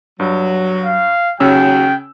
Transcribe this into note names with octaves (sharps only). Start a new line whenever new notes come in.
G2 F#3
F5
D#2 C#3 F#3 C#4 F#4 G5 E6